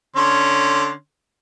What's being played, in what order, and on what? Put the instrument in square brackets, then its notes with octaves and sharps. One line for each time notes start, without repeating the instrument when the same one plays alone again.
[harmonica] D3 C#4 C6